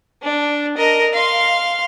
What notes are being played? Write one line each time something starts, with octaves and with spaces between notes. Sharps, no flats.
D4
A#4 D#5
F5 C6